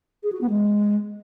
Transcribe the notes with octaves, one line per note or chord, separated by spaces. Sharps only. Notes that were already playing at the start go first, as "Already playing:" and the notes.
G#4
F#4
B3
G#3